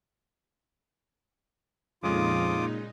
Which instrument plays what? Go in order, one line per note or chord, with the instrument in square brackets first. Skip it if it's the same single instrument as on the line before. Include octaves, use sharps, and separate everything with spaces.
[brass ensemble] F2 [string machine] A#2 D#4 [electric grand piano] C#3 G#3 [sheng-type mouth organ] F4 D6 D#6